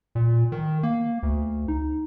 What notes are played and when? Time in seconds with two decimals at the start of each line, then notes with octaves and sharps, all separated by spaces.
0.15 A#2
0.52 D#3
0.83 A#3
1.23 D2
1.68 D#4